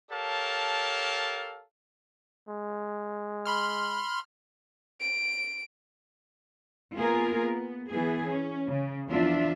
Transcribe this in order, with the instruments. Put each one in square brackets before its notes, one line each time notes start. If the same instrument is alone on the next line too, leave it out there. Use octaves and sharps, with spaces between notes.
[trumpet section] G4 A4 A#4 C#5 F5 A5
[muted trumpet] G#3
[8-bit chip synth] B5 C6 F6
[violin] D7
[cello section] A#3 B3 F4 G#4 A#4
B3
E3 B3 G#4
C#4
C#3
E2 F3 D4 F4 E5